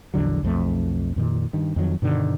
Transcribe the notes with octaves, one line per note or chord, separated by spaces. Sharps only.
A#1 E2 D3 F#3
B1 F2 A3
F2 A#2 D#3
G2 D#3
F2 D#3 F#3
G2 B2 D3 D#3